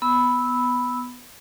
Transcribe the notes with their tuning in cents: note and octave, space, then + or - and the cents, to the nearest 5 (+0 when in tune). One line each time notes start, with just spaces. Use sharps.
B3 +0 B5 +0 E6 -15